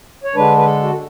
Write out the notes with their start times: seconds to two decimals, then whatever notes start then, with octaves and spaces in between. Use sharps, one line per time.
0.24 C#5
0.35 D3 G#3 D4 B4
0.57 B4
0.65 A4
0.83 F#4